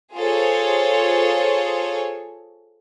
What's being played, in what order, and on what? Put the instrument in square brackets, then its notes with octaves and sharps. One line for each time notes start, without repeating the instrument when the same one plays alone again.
[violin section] F4 G#4 A4 C5 C#5